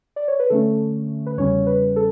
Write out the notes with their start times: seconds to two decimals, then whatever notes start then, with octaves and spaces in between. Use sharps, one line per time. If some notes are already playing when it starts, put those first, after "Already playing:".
0.16 D5
0.28 C#5
0.39 B4
0.50 D3 A3 C#4 A4
1.26 B4
1.37 E2 C#3 G3 C#4 C#5
1.67 B4
1.96 A4